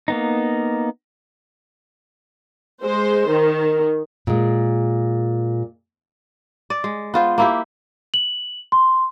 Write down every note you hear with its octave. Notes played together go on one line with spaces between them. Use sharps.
A#3 B3 D#4
G#3 C5
D#3
A#2 G#3
D5
G#3
B3 F4 C5
A#3 E4 G4
F#7
C6